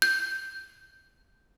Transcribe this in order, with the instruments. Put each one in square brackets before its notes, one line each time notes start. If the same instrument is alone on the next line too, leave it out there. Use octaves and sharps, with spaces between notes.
[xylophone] G6